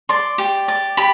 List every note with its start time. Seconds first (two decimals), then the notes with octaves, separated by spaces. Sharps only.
0.09 D5 C6
0.38 G4
0.68 D5
0.97 G4 B5